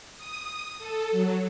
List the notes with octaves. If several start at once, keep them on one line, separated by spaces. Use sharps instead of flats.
D#6
A4
F#3